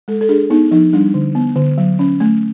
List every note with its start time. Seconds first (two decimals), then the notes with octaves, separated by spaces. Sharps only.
0.08 G#3 A4
0.21 A4
0.29 D4 G#4
0.50 B3 D#4
0.71 F3 D#4
0.93 G3 D4
1.14 D3
1.35 B3
1.56 D3
1.78 F#3
1.99 C#4
2.20 A3